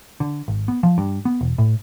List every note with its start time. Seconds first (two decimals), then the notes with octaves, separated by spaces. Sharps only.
0.20 D3
0.48 G#1
0.68 B3
0.83 F3
0.98 G2
1.25 B3
1.41 E1
1.58 A2